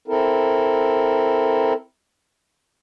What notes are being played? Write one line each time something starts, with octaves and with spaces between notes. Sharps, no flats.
C4 E4 A4 A#4